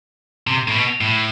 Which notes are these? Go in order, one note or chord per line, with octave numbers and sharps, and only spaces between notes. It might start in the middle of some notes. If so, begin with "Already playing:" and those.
C3
A2
B2
A2